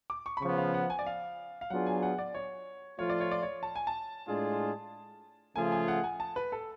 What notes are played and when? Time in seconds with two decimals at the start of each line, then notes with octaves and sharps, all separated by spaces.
0.10 D6
0.26 C#6
0.37 B5
0.42 C#3 F3 B3 C#6
0.58 F5
0.74 F#5
0.90 G#5
0.99 D5
1.06 F5
1.61 F5
1.70 F#3 B3 D4 F4 G#4 F#5
1.86 G#5
2.03 F#5
2.19 D5
2.35 C#5
2.99 F3 A3 F4 C#5
3.10 D5
3.20 C#5
3.31 D5
3.43 C#5
3.63 A5
3.76 G#5
3.87 A5
4.28 A2 G#3 D4 F4 G#4
5.56 C#3 F3 A3 F4 G#4 G#5
5.72 G#5
5.88 F#5
6.04 G#5
6.20 A5
6.36 B4
6.52 A4